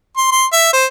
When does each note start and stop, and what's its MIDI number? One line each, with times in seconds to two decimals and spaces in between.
0.17 0.28 84
0.31 0.46 84
0.52 0.70 76
0.73 0.86 72